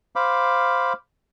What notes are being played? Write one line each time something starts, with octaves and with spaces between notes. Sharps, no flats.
C5 F5 B5 D6